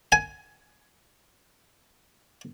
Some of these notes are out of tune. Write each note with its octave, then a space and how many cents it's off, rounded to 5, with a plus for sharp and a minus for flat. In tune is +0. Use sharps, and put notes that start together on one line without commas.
G#5 +15